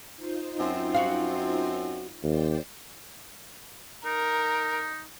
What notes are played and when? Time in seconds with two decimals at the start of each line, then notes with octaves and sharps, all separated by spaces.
0.16 D#4 F4 C5
0.59 F#2 C4
0.94 F#4 F5
2.24 D#2 C5 D5 G5
4.05 D#4 A#4